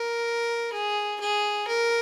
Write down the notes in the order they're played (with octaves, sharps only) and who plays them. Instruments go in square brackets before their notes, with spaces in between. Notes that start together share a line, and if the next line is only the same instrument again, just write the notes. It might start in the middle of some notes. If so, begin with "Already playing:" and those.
Already playing: [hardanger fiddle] A#4
G#4
G#4
A#4